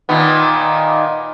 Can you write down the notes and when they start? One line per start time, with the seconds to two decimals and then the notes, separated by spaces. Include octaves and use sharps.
0.09 A#2 D#3 B3